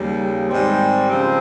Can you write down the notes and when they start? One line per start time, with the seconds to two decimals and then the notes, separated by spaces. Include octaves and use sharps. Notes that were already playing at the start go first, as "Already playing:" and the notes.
Already playing: D#2 C#3 G3
0.48 G#2 D#3 G3 C4
1.09 C#3 F3 C4